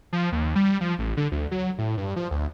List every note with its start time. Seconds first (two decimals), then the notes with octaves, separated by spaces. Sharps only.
0.13 F3
0.32 D#2
0.56 G3
0.81 F3
0.99 A1
1.17 D3
1.32 D2
1.51 F#3
1.78 A2
1.97 G2
2.16 F3
2.31 D2